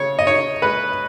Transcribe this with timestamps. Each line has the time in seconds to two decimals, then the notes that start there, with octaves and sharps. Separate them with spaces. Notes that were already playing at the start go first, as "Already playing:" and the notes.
Already playing: C#3 C#5
0.19 D#5
0.27 D#4 C#5
0.62 G#3 B4